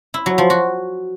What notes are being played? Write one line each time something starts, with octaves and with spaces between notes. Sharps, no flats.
E4
F#3
F3
F#4